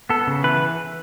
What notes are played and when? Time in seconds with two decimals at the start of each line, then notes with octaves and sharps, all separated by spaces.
0.09 B3 A4
0.27 C#3
0.44 E3 B4